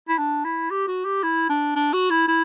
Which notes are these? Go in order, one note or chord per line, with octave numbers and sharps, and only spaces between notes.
E4
D4
E4
G4
F#4
G4
E4
D4
D4
F#4
E4
E4